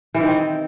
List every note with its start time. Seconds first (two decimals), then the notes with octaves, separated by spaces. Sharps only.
0.14 E3
0.20 D#3
0.26 C4